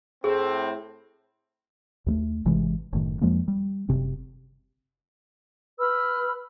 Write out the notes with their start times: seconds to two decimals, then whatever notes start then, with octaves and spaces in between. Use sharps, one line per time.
0.24 A2 C4 G#4
2.06 D#2 G#3 A3
2.45 G#1 C3 E3 G#3
2.93 F#1 A2 D#3
3.21 F2 F3 G#3 A#3
3.48 G3
3.89 F#1 C3 C4
5.78 B4 B5 E6 F6